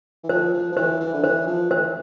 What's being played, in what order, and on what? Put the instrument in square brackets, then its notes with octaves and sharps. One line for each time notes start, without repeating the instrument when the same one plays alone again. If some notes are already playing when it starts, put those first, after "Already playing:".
[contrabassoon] E3
[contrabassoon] F3 [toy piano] C5
[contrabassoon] F3
F3
[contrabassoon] E3 [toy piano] C5
[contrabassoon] E3
D3
[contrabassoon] E3 [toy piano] C5
[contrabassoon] F3
[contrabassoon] E3 [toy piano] C5